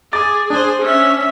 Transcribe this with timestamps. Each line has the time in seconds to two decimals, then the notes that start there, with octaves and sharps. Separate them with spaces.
0.13 G#4 D6 A6
0.50 D4 G#4 C5
0.82 C#4 E5